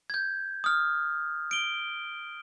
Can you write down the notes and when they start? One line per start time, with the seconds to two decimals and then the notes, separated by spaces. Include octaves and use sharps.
0.10 G6 G#6
0.64 D#6 F6
1.51 D7 G7